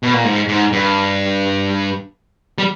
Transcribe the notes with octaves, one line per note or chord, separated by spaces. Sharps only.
B2
A#2
G#2
G#2
G2
G3